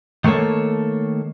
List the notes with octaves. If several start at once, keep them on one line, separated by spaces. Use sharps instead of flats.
D#3 A3 A#3 A4 C#5